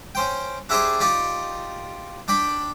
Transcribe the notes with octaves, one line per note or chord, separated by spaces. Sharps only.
C#4 C5 G5
D4 E4 G4 G#4 C5 D5
D#4 F4 G4 D5
D4 D5 G5 B5